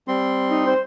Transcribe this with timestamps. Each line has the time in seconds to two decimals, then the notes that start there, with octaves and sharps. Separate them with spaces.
0.08 G3 C4 C6
0.50 D#4
0.67 C5